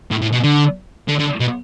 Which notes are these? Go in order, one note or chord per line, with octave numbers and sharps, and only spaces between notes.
A2
A2
B2
D3
D3
D3
B2